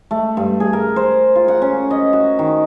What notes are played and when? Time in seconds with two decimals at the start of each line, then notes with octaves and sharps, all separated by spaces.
0.11 A3
0.37 G2
0.60 G#4
0.73 A#4
0.96 C5
1.35 F4
1.48 F#5
1.62 C#4
1.91 D#5
2.13 F#4
2.39 D#3